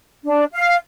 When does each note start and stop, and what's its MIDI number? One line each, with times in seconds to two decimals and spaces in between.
0.25 0.44 62
0.52 0.75 77